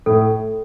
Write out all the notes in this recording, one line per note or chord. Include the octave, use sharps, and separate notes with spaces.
A2 A4